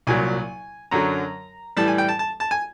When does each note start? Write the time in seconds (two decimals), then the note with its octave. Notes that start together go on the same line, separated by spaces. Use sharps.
0.07 C2 A#2 F#3 G#5
0.91 F#2 D3 F#3 A#5
1.77 A2 E3 G3 A5
1.88 G#5
1.98 G5
2.09 A5
2.19 A5
2.40 A5
2.51 G#5